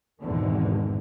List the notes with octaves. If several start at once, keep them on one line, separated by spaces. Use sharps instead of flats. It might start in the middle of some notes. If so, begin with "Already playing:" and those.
G#1 E2 G#2 B2 D3 D#3